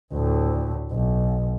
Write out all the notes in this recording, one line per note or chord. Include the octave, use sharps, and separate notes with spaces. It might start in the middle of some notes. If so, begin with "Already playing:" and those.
D2 A2
B1